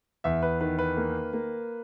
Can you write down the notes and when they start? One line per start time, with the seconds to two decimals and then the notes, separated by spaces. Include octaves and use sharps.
0.24 E2 E5
0.43 B4
0.61 D#3 B4
0.79 B4
0.97 A#3
1.33 A#3